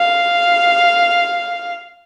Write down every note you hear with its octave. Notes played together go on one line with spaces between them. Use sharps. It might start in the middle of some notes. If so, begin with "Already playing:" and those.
Already playing: F5